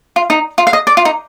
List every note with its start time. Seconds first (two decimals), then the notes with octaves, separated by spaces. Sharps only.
0.16 F4
0.30 D#4
0.58 F4
0.67 F5
0.73 D#5
0.87 D5
0.97 F4
1.05 D#4